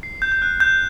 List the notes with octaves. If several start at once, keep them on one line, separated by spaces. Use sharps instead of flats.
C7
G6
G6
F#6
G6